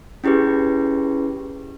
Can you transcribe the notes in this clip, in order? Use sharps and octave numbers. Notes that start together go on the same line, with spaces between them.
C#4 E4 G4 G#4 B4